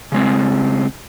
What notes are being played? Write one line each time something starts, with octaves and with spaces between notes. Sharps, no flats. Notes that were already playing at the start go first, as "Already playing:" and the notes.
C#3 G#3 C4